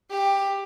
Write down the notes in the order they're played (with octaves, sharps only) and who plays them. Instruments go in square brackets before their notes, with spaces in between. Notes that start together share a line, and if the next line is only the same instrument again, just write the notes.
[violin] G4